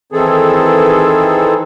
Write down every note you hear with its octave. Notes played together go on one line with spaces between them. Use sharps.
D#3 E3 C4 G#4 A4